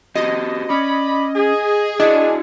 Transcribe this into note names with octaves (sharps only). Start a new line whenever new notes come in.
C4 F#4 G4 D#5
C#4 D5 B5
G#4
D4 E4 F#4 D#5